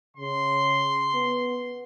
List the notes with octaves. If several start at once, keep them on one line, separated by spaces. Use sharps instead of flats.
C#3 C6
B3